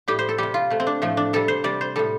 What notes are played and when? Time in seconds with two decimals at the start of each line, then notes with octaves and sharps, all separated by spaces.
0.08 A2 G3 G4
0.19 C5
0.29 A4
0.38 C3 G3 G4
0.54 F4
0.70 C3 A3
0.80 C4
0.87 D4
1.02 A2 F3 A3
1.17 D4
1.33 C3 G3 A4
1.48 C5
1.64 C3 G3 D5
1.81 C5
1.96 A2 G3 A4